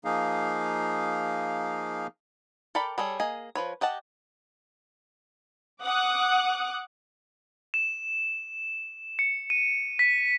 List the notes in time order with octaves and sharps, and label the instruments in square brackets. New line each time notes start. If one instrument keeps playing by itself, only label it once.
[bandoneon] F3 A#3 D#4 G#4 F5
[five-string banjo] A4 A#4 D5 G5 B5
G3 G#4 A4 C#5
A#3 G#4 D#5 G#5
F3 B4 C#5
G4 D#5 F#5 A5
[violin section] F#5 D6 D#6 F#6
[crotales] E7
C#7
D#7
B6